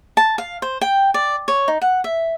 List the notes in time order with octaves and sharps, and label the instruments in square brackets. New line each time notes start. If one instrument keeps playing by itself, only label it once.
[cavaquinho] A5
F5
C5
G5
D5
C#5
D#4
F#5
E5